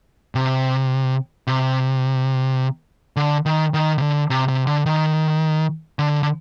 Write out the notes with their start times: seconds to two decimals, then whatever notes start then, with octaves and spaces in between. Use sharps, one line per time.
0.35 C3
1.47 C3
3.17 D3
3.46 D#3
3.74 D#3
3.98 C3
4.02 D3
4.30 C3
4.48 C3
4.67 D3
4.86 D#3
5.99 D3
6.23 D3